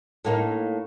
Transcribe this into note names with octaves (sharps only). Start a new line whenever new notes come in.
A2 A#3 D#4